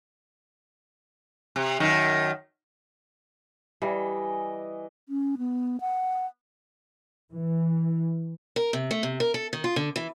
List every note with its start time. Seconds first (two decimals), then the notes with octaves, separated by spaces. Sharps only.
1.56 C3
1.80 F#2 D#3
3.82 E3 G3 D#5
5.09 C#4
5.38 B3
5.81 F#5
7.30 E3
8.56 A#4
8.73 C3
8.91 A3
9.03 C3
9.20 A#4
9.34 A4
9.53 D#3
9.64 F4
9.76 D3
9.96 E3